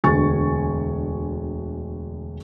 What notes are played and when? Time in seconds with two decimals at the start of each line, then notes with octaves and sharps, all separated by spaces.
0.04 E1 D2 G#5 C#6 A6